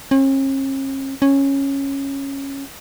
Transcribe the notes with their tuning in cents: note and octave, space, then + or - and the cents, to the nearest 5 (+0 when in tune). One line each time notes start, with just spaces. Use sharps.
C#4 -45
C#4 -10